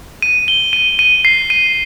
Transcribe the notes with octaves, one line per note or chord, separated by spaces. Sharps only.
D#7
G7
D#7
D#7
C7
D#7